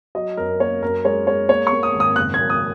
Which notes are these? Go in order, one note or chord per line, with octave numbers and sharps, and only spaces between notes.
F#3 D#5
F#2 A#4
A#3 C#5
F#2 A#4
G#3 C#5
G#3 C#5
A#3 C#5
C#6
A#3
D#6
G#1
D#6
F#1 F#6
F#2 G#6
D#6